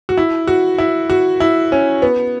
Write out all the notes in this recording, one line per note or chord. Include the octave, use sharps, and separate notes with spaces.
F#4
E4
F#4
E4
F#4
E4
C#4
B3